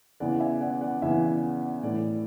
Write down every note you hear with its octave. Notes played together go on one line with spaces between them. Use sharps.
E2 C#3 E3 D5 F#5
E5 G#5
D5 F#5
D5 F#5
E2 C#3 E3 E5 G#5
A2 E3 D5